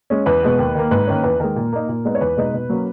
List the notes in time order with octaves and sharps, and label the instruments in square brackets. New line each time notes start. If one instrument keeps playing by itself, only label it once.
[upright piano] G#3 C#4
E2 B4
B2 G#3 B3
D#2
D#3 A#3
G#2 B4
D#3 A#3 C#4
E2 B4
D#3 G#3 A#4
A#2
A#3 D#4
A#2
G#3 B3 D#4
C#5
E2 B4
B2 G#3 D#4
B2
F#3 A#3 C#4